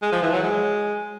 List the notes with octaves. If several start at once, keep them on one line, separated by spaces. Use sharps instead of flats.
G#3
F3
E3
F#3
G#3